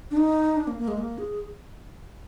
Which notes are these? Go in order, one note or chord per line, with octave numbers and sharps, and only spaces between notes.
D4
D#4
D4
A#3
A#3
G#3
A#3
G#4